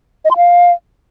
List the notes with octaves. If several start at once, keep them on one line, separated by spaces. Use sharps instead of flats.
D#5
C6
F5